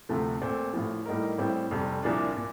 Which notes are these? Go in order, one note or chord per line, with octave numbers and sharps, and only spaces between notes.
D2 C3 F3 A3
A#2 A3 C4
A1 A2 F3
A2 G3 A#3 D#4 A#4
A1 A2 G3 C4 G4
F1 F2 C3 G3
C2 A#2 F3 A#3 D4
A#2